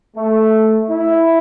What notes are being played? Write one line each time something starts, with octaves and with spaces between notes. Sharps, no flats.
A3
E4